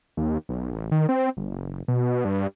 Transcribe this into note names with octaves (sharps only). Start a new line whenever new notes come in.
D#2
B1
A1
D#3
C4
G1
F#1
B2
G2